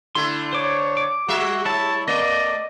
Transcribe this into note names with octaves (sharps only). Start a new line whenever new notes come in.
D3 A3 E4 C6
C5 C#5 D6
D6
G3 F#4 E5
E4 C#5 A5
A3 D5 D#5